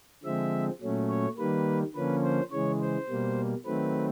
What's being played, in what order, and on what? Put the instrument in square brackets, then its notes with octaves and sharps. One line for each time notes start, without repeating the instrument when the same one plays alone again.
[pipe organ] D3 F3 G#3 C4 E5
A#2 F#3 A3 C#4
C#5
D#3 G3 A#3 B4
D3 F3 A#3 C#4 B4
C5
C#3 E3 G#3 C#5
C5
B2 G3 A#3
D#3 F#3 A3 C4 B4